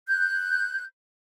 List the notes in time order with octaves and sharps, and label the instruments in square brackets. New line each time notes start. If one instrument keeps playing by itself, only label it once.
[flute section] F#6 G6